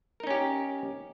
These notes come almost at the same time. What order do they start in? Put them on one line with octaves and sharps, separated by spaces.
A#4 D#4 C#4 G4